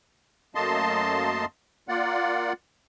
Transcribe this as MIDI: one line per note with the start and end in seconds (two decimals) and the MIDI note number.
0.55 1.45 42
0.55 1.45 57
0.55 1.45 58
0.55 1.45 75
0.55 1.45 81
0.55 1.45 84
1.89 2.53 58
1.89 2.53 65
1.89 2.53 74
1.89 2.53 78